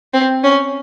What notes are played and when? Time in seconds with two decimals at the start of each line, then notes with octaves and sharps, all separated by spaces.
0.14 C4
0.44 C#4